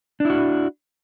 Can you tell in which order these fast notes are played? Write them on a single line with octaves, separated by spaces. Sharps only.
D4 E4 F#4